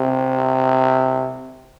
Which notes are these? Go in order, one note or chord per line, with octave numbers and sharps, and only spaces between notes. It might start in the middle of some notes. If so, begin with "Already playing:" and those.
Already playing: C3